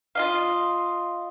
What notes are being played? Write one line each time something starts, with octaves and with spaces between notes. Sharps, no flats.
F4 D#5 F5